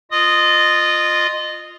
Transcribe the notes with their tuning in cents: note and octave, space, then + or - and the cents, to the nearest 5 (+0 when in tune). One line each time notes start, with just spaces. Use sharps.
F4 +0 D#5 -25 D#6 +0